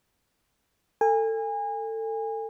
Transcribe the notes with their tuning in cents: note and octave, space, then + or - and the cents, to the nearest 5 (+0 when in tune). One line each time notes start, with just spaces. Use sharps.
A4 +25 G#5 -30